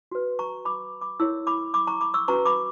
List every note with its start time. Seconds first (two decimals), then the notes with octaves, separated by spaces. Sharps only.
0.12 F#4 B4
0.39 A#5 C#6
0.65 B5 D6
1.01 B5 D6
1.20 E4 A#4 C#5 C#6 E6
1.47 B5 D6
1.74 B5 D6
1.87 A#5 C#6
2.01 B5 D6
2.14 C#6 E6
2.28 C#4 F#4 B4 A#5 C#6
2.45 B5 D6